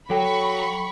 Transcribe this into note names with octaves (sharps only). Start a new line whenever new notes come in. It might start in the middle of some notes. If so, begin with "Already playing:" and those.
F#3 A4 G5 B5 C#6